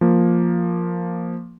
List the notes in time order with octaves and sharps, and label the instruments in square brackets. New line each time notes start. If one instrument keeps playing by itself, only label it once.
[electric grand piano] F3 A#3